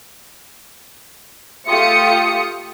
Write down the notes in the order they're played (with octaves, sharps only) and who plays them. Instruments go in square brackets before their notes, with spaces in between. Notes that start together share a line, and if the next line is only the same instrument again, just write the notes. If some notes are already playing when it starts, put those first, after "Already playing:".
[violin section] A3 F4 G4 D#6 C#7